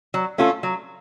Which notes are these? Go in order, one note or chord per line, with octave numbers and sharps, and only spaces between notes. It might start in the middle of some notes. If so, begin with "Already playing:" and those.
F#3
A3 C#4 F4 A4
F#3